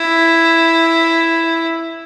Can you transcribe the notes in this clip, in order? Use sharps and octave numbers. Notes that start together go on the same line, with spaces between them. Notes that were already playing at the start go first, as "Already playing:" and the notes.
Already playing: E4